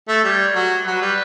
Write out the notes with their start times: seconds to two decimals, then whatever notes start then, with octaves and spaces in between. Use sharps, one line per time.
0.08 A3
0.24 G3 C#5
0.55 F#3
0.86 F#3 B4
1.02 G3